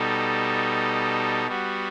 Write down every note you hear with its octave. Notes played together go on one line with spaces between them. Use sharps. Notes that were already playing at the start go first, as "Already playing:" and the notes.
Already playing: B2 G3 D#4 A4
G3 B3 F#4